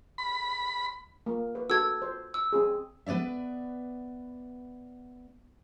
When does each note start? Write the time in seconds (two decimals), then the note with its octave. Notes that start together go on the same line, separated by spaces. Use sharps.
0.18 B5
1.26 A#3
1.55 B4
1.70 F#4 A4 E6 G#6
2.02 C5
2.34 E6
2.53 C4 G#4
3.06 B3 B4 C#5 D5 E5